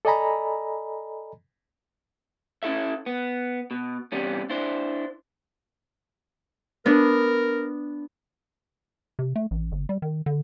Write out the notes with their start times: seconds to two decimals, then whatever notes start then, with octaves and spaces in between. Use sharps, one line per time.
0.05 A4 D5 D#5 G#5 A#5 B5
2.63 C#4 E4 A4 E5
3.06 B3
3.71 B2
4.12 E2 C3 G3 C#4
4.50 D4 E4 C5
6.86 B3 D4 A#4
9.19 C3
9.36 A3
9.51 A1
9.72 G1
9.89 G3
10.02 D#3
10.26 D3